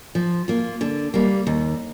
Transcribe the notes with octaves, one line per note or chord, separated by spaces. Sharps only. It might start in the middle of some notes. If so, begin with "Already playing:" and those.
F3
A#3 F4
D3
G3 A#3
D#2